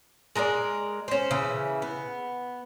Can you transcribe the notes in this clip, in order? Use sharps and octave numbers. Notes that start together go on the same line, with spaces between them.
G#3 A#4 B4 D5
C#4 C5
C#3 E3
B3